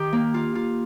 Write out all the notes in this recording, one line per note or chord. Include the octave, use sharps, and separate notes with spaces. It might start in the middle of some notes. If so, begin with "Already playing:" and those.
Already playing: D#3 G4
A#3
F4
F4